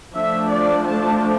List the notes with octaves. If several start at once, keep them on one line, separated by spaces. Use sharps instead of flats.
F3 A3 D4 E5
D5
A5